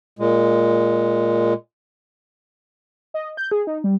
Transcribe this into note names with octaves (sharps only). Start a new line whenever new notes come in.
A#2 G#3
D#5
G6
G#4
D#4
G3